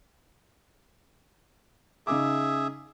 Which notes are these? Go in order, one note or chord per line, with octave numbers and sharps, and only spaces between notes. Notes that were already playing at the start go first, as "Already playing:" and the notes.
C#3 D#4 G#4 E5 D6